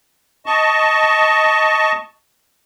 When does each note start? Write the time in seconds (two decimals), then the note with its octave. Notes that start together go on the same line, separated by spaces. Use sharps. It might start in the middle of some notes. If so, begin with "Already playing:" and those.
0.46 D#5 A5 C#6